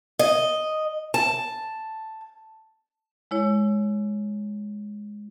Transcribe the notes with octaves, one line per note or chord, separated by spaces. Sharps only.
D#5
A5
G#3 E4 C#5